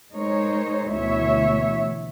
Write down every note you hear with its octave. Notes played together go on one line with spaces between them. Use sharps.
G#3 D#4 A#4 C5 C#5
D2 B2 E3 C#5 E5